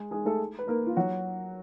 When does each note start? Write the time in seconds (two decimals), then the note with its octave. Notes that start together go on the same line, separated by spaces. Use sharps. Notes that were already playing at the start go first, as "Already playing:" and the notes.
Already playing: G#3 G#4
0.11 G#3 G#4
0.25 A3 A4
0.59 B4
0.67 A#3 A#4
0.87 F4
0.97 F#3 F#4